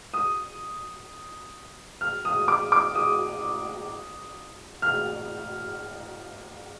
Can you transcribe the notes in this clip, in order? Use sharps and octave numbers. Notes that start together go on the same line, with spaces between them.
D#6
F6
D#6
D6
D6
D#6
F6